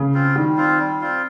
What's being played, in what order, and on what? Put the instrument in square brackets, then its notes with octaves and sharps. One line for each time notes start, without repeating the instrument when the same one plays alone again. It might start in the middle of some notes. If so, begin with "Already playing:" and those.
Already playing: [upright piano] C#3
[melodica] C4 F4
[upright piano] D#3 [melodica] G3
[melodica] C4 F4
G3
C4 F4